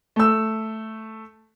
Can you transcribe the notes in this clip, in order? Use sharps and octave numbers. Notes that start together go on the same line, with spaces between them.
A3 E6